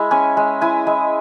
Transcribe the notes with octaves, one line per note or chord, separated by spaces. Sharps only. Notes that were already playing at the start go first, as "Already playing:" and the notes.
Already playing: G#3 E4
C#4 G#5
G#3
E4 G#5
G#3